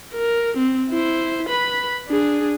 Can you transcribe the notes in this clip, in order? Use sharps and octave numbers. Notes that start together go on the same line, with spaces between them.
A#4
C4
E4 C5
B4 B5
D4 G#4